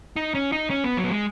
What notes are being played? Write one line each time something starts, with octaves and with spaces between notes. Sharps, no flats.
D#4
C#4
D#4
C#4
B3
F#3
B3
G#3